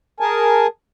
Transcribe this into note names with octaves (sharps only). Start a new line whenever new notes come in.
G#4 A#4 G#5 A5